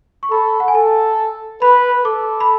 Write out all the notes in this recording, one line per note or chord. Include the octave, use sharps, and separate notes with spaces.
C#6
A4 B5
F#5
G#5
A4 A5
B4 B5
A4 D6
B5